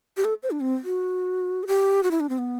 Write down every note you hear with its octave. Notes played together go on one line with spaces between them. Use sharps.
G4
A4
C5
D4
C4
F#4
A4
G4
F#4
E4
D4
C4
B3